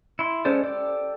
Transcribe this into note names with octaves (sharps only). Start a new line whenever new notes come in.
E4 C6
G#3 C#4 A4 C5 D5
G4 A4 D5